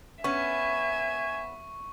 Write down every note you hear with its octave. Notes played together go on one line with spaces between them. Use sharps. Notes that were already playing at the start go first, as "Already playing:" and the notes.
B3 C#4 E5 G#5 C#6